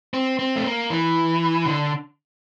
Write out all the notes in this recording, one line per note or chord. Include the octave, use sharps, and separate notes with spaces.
C4
C4
A3
A#3
E3
D3